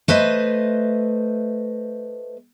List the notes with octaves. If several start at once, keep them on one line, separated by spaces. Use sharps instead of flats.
A3 B4 C5 D#5